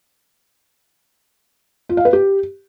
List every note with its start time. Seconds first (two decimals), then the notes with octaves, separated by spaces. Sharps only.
1.89 F4
1.97 F5
2.05 B4
2.13 G4